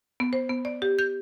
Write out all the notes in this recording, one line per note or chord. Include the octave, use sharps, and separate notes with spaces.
B3
C5
B3
D5
G4
G6